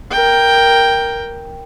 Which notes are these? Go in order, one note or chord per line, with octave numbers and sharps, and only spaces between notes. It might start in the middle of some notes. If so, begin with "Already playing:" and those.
A#4 G5